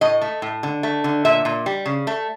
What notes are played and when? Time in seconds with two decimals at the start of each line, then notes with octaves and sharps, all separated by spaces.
0.01 A2 D#5
0.21 A3
0.42 A2
0.63 D3
0.83 A3
1.04 D3
1.25 A#2 E5
1.45 A#2
1.66 G3
1.86 C#3
2.07 A3